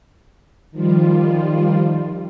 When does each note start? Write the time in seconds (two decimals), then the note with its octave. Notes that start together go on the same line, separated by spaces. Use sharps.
0.71 D#3 F3 G3 F4